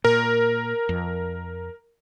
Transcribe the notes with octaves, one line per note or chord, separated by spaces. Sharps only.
A#2 A#4
F2